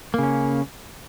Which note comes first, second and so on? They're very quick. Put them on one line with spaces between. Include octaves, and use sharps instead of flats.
A#3 C#3 C#4